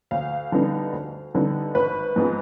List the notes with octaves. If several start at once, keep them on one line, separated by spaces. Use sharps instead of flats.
D2 F5
D3 G3 B3 D#4
D2
D3 G3 B3 D#4
G#1 B4
G#2 F3 G#3 B3